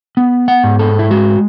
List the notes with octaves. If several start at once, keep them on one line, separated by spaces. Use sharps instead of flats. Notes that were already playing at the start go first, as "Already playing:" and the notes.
B3
F#5
G#2
A4
E4
G#3 F#4